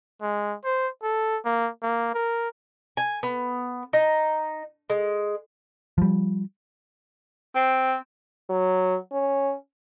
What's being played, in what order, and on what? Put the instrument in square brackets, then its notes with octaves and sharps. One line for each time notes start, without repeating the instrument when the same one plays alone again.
[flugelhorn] G#3
C5
A4
A#3
A#3
A#4
[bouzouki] G#5
B3
D#4
G#3
[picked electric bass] F3 G3
[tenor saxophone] C4
[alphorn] F#3
C#4